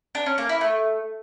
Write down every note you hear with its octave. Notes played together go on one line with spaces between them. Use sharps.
D4
C#4
A#3
E4
A3